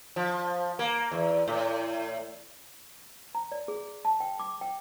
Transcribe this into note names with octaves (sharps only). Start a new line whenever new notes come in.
F3
A#3
E2
A2
A#5
D5
G#4
A5
G5
D6
G5